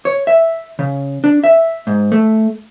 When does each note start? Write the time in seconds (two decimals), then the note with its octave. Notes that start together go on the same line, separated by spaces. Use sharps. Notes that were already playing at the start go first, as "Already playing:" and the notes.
0.05 C#5
0.27 E5
0.79 C#3
1.24 D4
1.44 E5
1.87 G#2
2.12 A3